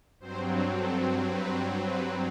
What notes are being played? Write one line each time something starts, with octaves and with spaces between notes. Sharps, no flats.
G2 F#3 C4 C5
A4
B4
B4